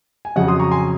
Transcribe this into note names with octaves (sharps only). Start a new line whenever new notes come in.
G#5
F2 C#3 F#3 D#5 F#5
C6 D#6
A#5 C#6
G#5 C6